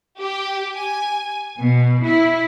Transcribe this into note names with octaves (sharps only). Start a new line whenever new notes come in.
G4
G#5
B2
E4